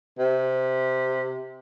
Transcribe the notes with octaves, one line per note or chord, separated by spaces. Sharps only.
C3